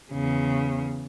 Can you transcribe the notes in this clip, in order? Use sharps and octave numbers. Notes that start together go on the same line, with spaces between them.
E2 C#3